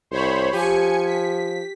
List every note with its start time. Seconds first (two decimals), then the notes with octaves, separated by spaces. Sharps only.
0.11 C2 C5 C#5 B5
0.53 F3 G4 G#5 C#7
1.06 B6